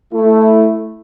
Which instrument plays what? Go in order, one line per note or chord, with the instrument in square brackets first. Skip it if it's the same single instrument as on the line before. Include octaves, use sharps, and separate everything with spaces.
[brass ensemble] A3 E4